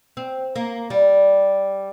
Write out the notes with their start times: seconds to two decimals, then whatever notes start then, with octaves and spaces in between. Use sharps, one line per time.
0.17 C4
0.56 A#3
0.90 G3